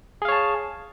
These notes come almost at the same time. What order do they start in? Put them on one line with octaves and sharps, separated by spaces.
G#4 F5 C#5 A5